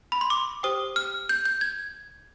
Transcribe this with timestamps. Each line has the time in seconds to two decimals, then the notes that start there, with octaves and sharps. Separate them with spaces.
0.12 B5
0.21 C6
0.30 D6
0.63 G4 C5 G5 D#6
0.96 F6
1.29 G6
1.45 G6
1.61 G#6